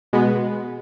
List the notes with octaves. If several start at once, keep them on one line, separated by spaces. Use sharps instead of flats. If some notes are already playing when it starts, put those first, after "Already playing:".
B2 G#3 B3